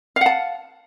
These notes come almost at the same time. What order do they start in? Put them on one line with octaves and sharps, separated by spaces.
F5 F#5 A5